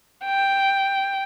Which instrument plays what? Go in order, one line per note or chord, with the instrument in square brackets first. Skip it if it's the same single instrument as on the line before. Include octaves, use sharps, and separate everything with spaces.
[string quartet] G5